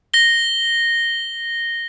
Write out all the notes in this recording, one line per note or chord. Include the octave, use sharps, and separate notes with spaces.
A#6 G7